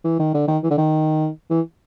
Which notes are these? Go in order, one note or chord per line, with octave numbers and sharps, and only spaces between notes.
E3
D#3
D3
D#3
E3
D3
D#3
E3